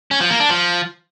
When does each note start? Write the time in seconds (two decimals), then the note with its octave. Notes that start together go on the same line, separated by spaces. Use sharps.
0.11 C#4
0.21 F3
0.30 A#3
0.40 D4
0.50 F3